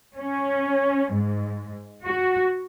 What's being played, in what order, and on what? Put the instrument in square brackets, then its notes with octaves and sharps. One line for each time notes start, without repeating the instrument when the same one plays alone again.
[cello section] C#4
G#2
F#4